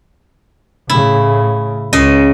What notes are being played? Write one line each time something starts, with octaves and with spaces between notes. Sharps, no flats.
A2 C#3 E4
C#2 C#3 D#5